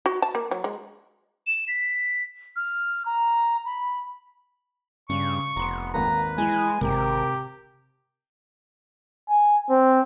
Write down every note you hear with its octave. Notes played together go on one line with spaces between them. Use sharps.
F#4
A5
A#3
F#3
G#3
E7
B6
F6
A#5
B5
G2 C#3 C#6
F1 B3 A#5 C6
G#1 D#2 A#3 B4 A#5
E3 G#3 G#5
G#1 C3 G4 A#4
G#5
C4